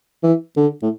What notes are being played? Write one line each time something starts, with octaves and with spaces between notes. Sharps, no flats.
E3
D3
A2